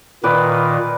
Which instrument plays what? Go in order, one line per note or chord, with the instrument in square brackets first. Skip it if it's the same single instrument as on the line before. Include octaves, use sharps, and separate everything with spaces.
[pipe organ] A#2 D#3 [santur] B4 D5